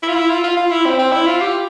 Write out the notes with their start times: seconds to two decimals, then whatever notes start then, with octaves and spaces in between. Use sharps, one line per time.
0.02 E4
0.08 F4
0.15 E4
0.30 F4
0.44 F4
0.57 F4
0.71 E4
0.86 C4
0.99 C4
1.12 E4
1.26 F4
1.41 G4